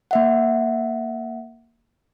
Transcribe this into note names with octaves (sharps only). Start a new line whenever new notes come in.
A#3 E5 F#5